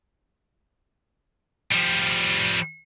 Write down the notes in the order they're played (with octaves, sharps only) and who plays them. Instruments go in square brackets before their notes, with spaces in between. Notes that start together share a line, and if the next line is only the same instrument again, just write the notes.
[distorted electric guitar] F3 G3